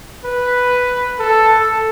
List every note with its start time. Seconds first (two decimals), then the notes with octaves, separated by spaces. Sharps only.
0.25 B4
1.19 A4